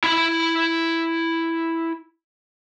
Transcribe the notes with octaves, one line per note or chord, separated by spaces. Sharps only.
E4 B5